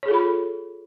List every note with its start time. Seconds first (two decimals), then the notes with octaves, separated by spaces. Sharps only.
0.03 C#5
0.06 G#4
0.08 A4
0.11 F4
0.14 B5